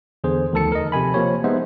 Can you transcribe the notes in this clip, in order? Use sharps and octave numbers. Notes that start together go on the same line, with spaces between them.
E2 D3 G#4 C5
D2 D#3 F3 A4 A5 C#7
A#4 D#5
C3 F3 G#5 B5
F3 A#3 G4 C#5
G#3 B3 D#4 C5 E5